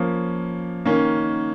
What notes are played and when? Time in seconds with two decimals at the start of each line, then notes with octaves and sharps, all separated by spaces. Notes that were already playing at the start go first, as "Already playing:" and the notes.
Already playing: F3 A#3 C#4
0.85 D#3 A#3 C#4